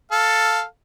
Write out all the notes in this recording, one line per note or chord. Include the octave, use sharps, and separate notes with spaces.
A4 F5